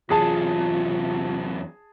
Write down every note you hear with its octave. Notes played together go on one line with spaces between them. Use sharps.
E2 C3 F#3 F4 G#4 A5